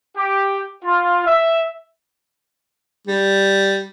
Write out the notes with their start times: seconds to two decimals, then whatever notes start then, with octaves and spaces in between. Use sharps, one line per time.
0.16 G4
0.84 F4
1.26 E5
3.07 G3